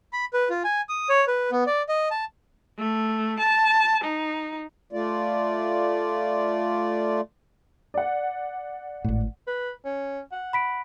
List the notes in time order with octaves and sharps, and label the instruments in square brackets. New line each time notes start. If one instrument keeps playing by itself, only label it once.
[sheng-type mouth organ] B5
B4
F4
G#5
D#6
C#5
B4
B3
D5
D#5
A5
[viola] A3
A5
D#4
[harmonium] A3 F4 D5
[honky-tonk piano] D5 F#5
[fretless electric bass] G#1 A2
[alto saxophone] B4
C#4
F#5
[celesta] B5 B6 D7